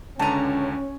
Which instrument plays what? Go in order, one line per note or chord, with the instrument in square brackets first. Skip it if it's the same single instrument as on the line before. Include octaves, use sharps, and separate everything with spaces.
[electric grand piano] C#2 D3 D#7 [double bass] C#4 [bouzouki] A5 A#5